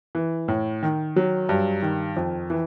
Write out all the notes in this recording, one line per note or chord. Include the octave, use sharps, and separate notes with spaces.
E3
A2
D#3
F#3
G2
D#3
F2
E3